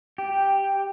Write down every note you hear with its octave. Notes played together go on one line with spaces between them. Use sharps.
G4